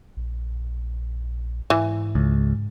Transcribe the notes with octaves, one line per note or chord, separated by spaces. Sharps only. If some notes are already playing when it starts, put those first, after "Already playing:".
A#1
G#2 E3
C#2